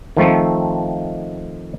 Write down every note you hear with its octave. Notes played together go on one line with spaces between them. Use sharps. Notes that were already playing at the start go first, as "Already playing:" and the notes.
D#3 F3 A3 C4